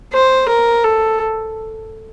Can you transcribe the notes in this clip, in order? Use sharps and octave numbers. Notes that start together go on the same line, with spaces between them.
C5
A#4
A4